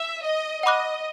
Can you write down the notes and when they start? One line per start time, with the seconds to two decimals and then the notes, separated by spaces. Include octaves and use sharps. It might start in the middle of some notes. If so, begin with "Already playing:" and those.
Already playing: E5
0.24 D#5
0.63 D#5 F#5 B5 D6 F#6